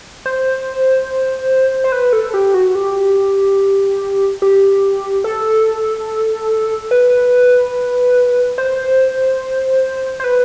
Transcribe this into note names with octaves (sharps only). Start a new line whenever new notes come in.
C5
C5
B4
A4
G4
F#4
G4
G4
A4
B4
C5
C5
B4